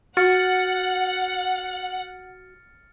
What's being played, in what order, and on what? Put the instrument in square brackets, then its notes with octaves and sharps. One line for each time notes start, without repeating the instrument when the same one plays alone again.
[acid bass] F#4 [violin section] F#5 [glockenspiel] F6 A6 C#7